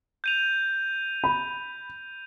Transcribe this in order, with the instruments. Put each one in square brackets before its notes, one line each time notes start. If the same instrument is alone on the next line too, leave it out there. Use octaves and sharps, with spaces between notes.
[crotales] G6 D#7 F7
[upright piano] B5